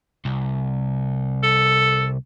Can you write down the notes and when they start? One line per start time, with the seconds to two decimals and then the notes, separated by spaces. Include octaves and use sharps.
0.25 C2
1.43 A4